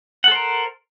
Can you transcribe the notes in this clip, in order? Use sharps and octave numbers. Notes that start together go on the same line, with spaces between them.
A4 A#4 C5 F#5